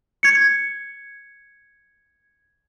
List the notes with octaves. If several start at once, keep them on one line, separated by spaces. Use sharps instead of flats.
G#6 C#7